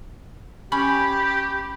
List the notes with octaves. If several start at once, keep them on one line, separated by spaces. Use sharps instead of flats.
C#4 G4 B5